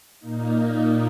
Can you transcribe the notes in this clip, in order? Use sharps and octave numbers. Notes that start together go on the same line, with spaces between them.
A#2 A#3 D#4